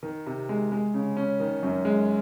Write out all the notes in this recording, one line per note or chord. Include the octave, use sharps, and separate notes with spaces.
D#3
C3
G#3
G#3
C#3
C#4
D#3
F#2
G#3